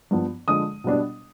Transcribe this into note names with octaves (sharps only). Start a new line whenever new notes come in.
G2 F3 B3
D3 F3 G#3 D#6
B2 G3 B3 D4